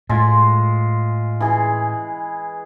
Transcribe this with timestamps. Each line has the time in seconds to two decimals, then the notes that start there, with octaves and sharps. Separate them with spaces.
0.09 A2 G#3 F4
1.40 E3 G#4